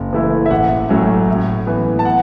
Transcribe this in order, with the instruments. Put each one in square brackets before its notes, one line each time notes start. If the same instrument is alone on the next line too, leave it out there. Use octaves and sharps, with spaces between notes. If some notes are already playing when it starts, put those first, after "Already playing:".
Already playing: [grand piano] F#1
F#2 E3 A3 E4
E5
A1 F#5
A2 F#3 A3 C#4
A2
E3 B3
A5
F#5